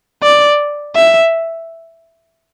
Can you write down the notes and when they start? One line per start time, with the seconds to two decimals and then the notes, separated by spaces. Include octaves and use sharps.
0.23 D5
0.96 E5